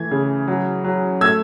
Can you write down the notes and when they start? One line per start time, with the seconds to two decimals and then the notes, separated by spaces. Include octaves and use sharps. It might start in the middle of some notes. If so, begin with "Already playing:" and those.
Already playing: E3 A3 G#6
0.11 C#3
0.48 F#3
0.84 F#3
1.21 A3 E6 G#6